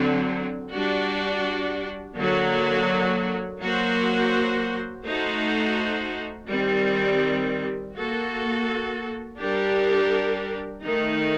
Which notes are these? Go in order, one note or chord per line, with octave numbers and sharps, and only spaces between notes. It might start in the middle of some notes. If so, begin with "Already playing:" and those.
Already playing: D3 F#3 C4
G3 D4 F#4
D3 F#3 A#3 F#4
F#3 A#3 F#4 C5
A3 D#4 F#4 C5
D#3 G3 C4
A#3 F#4 A4
G3 D4 G4 A#4
D#3 A3 D#4